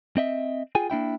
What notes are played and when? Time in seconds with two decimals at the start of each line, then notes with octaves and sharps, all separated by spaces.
0.17 C4 D#5 E5
0.75 F4 G#4 G5 G#5
0.90 A#3 D4 E4 G5